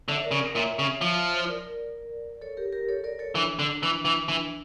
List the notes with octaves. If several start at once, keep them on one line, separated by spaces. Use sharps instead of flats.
D3 C#5 E5
A#4 D5
C#3
A#4 D5
A#2 C#5 E5
C#3
F3
A#4 D5
A4 C#5
G4 A#4
G4 A#4
A4 C#5
A#4 D5
A4 C#5
E3 D4
D3
E3
E3
E3 D4